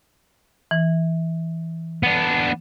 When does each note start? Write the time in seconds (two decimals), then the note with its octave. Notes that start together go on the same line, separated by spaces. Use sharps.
0.71 E3
2.03 B3 D4